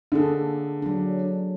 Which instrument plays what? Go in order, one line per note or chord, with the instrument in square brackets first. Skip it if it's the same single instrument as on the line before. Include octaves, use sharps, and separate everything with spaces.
[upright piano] D3 [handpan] A#3 G#4 A4
[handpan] F#3 D4